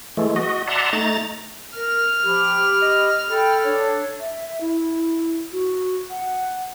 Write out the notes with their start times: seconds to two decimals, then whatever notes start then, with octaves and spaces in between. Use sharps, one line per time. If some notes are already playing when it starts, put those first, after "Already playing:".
0.17 E3 G#3 A3
0.36 F#4 D#5
0.67 D5 E5 F#5 A5 A#5 C6
0.93 A3 D#4 A#5 A6
1.76 A#4 F6
2.23 F3 G4 B5
2.82 D#5
3.29 A4 G5 B5
3.63 D4 C#5
4.20 E5
4.61 E4
5.53 F#4
6.10 F#5